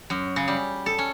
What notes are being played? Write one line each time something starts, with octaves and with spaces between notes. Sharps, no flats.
F#2
C#3
G3
A4
C#4